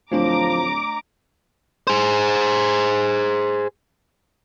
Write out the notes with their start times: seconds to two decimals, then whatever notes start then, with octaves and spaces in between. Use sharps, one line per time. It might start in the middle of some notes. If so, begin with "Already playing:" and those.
0.12 D1 F3 A3 D4 C#5 A#5 D6
1.87 G#4 C5